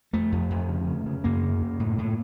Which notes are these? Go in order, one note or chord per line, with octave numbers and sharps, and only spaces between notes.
F2 A3
F2
F2
C#3
C#3
C#3
F#2 A#3
C#3
F#2
A2
A2